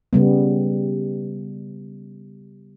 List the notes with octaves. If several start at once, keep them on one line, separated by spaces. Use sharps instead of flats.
C#3 G3 B3